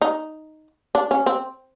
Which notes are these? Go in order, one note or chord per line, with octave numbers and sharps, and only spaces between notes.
D#4
D4
C#4
C4